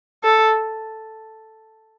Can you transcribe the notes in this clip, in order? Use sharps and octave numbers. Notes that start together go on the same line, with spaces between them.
A4